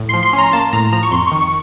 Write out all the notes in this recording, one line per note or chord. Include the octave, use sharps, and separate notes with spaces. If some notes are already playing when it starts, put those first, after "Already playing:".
Already playing: A2
C6
F3
C6
C#4
A#5
A#3 A5
A2 A#5
F3 A#5
C#6
F2 C6
C#6
D#3
C#6